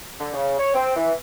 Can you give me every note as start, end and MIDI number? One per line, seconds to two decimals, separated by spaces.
0.19 0.32 50
0.34 0.58 49
0.59 0.71 73
0.74 0.93 60
0.96 1.13 52